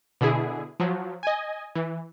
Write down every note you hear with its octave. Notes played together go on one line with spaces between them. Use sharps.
B2 D3 E4 G#4
F3 F#3
D#5 G#5
E3